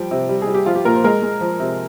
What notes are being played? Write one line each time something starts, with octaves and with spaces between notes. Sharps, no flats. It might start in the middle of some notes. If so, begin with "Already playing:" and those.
Already playing: F3 G3 G5
C3
G3
G#4
G3
G4
F3 F4
G4
A#2 A#4
C5
G#3 A#4
G#3
F3
C3